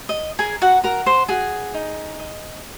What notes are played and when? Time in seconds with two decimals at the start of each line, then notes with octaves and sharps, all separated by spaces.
0.09 D#5
0.39 G#4 A#4 G#5
0.62 F#4 F#5
0.83 F#4 A#4 A#5
1.06 C5 C6
1.28 F#4 G#4 G#5
1.74 D#4
2.20 D#5